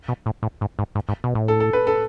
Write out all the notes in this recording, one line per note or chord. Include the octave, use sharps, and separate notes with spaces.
B2
A2
A2
G#2
G#2
G#2
G#2
B2
A2
A4
A4
B4
A4